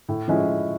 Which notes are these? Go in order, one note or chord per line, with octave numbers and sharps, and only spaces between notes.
A2
F3 G#3 C#4 E4